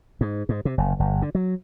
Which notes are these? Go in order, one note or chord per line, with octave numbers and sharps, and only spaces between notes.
G#2
G#2
C3
F#1
G1
D3
F#3